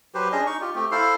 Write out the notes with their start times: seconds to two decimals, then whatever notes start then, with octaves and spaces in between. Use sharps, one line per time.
0.14 F#3 G4 B4 C5
0.32 C#4 D4 G#4 D#5
0.47 D#4 C#6
0.61 F4 G4
0.75 A3 C4 G4
0.92 E4 A4 C5 F5